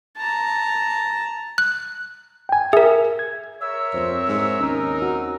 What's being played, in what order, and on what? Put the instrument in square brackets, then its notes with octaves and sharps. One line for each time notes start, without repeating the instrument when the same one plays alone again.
[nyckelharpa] A5 A#5
[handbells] F#6
[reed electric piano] G5 G#5
[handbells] G#4 A#4 [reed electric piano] E5
[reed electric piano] G#6
[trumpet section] A#4 C#5 E5 [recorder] E6
[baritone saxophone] F2 [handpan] C4 C5
[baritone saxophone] G#2
[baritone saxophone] D#2 [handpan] C#4 [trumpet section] D#4 A#4
[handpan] F#4